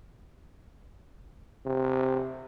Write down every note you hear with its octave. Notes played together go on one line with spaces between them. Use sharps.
C3